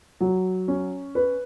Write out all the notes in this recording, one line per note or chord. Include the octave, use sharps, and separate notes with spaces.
F#3
C#4
B4